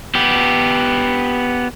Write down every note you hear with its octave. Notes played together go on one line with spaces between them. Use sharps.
B3 G4